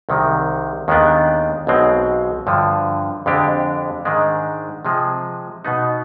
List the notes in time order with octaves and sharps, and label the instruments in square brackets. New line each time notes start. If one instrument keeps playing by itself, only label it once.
[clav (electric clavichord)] C2 C3 D#3 G#3
D#2 D#3 G#3 B3 D4
B1 B2 G#3 C4
G2 D3 F3
F2 D3 G#3 D4 G4
G#2 D#3 G#3 D4
C3 F3 G#3
B2 B3 D#4